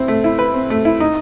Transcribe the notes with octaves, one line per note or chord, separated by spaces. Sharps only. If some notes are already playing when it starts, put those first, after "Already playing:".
Already playing: C4 E4
A3
E4
B4
C4
A3
E4
D#4